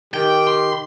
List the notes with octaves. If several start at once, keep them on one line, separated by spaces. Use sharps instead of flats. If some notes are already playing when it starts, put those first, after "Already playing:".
D#3 G4 G5
C6